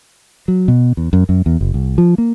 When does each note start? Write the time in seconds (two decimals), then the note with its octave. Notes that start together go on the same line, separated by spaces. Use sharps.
0.48 F#3
0.68 B2
0.97 E2
1.13 F#2
1.29 F#2
1.46 E2
1.61 F#1
1.74 C2
1.98 F3
2.18 A#3